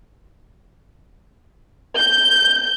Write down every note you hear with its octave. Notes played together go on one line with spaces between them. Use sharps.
G6